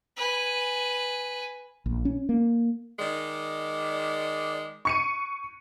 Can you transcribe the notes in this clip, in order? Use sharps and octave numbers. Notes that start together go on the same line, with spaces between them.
B4 G#5
A#1
C#4
A#3
D#3 G#3 D5
C#6 C#7 D#7